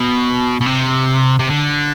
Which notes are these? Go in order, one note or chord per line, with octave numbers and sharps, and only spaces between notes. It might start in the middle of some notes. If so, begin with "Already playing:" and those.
Already playing: B2
B2
C3
C3
D3